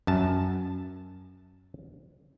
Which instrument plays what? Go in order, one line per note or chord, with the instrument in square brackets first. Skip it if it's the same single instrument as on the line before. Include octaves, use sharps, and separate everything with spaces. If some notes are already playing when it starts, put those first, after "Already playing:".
[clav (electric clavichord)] F#2 A5